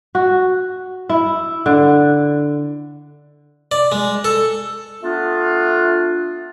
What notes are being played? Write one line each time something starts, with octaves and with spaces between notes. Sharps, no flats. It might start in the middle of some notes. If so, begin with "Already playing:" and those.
F#4
E4
D3
D5
G#3
A4
A3 B3 D4 F4